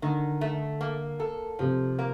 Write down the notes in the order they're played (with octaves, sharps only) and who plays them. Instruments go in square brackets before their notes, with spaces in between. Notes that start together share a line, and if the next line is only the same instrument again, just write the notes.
[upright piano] D3 [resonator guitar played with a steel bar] D#3
[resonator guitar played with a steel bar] A3
A#3
A4
[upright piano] C3 [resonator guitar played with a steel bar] F3
[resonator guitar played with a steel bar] A#3